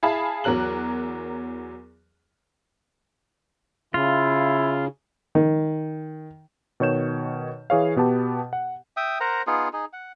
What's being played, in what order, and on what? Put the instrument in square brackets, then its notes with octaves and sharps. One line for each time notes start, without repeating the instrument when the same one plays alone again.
[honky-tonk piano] E4 G#4 F5 A5 B5
E2 F#3 A#4 F#6 F#7
[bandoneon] C#3 [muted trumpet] E4 [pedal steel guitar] F4
[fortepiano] D#3
[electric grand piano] B2 D#3 C#5 G6 E7
E3 G#4 C#5 F5
B2 B3 G4 A5
F#5
[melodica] E5 G5 D#6
A#4 C5 F#5 A#5
B3 D#4 F4 G#4
D#4 G#4
F#5